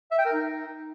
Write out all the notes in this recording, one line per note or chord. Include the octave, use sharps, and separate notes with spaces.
E5
G5
A#4
D#4